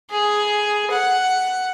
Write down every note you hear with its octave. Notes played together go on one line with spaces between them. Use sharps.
G#4
F#5